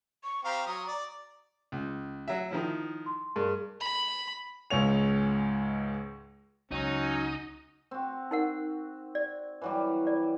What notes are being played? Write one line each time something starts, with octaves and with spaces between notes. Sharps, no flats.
C#6
C4 G4 F5 A#5
F#3 D#6
D5
C#2
F#3 E5
D#3 F3 E4
C6
G2 G#4 A#4
B5
C#2 G#2 C#5 F7
C#2 F#3 C#4 D#4
C4 F#4
D#4 A#4 F#5
D5
E3 F#3 G3
D5